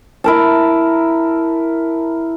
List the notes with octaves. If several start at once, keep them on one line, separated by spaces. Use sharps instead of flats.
E4 A#4 A5